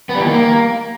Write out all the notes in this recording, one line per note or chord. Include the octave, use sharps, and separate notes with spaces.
B3
G3
E3
D#3
A#3